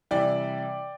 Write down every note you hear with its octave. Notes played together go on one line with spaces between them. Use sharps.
C3 E3 G3 D5 G5